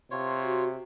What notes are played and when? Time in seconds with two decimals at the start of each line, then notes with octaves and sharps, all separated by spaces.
0.11 C3 F4 C#5
0.43 F#4